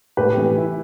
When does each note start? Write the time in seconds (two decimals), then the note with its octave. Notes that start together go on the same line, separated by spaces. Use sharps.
0.17 A2 G4 B4
0.37 E3
0.57 E4